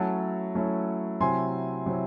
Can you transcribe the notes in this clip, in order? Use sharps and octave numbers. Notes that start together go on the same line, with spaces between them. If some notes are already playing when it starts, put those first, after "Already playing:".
Already playing: F#3 A3 C#4 E4 F#5 A5
F#3 A3 C#4 E4
C3 F#3 C4 E4 G#5 C6
C3 F#3 C4 E4